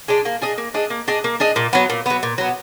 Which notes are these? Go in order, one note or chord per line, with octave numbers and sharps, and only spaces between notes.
G#3 D4
A#3
D4 G#4 D#5
A#3
D4 G#4 D#5
A#3
D4 G#4 D#5
A#3
D4 G#4 D#5
A#2
F#3 B3
A#2
F#3 B3
A#2
F#3 B3